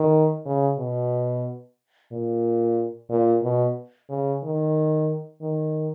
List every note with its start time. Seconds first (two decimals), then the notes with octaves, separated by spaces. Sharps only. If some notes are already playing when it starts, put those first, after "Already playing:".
Already playing: D#3
0.46 C#3
0.79 B2
2.12 A#2
3.10 A#2
3.43 B2
4.09 C#3
4.43 D#3
5.42 D#3